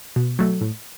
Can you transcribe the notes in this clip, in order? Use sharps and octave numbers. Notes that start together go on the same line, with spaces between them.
B2
F#3 A3
A2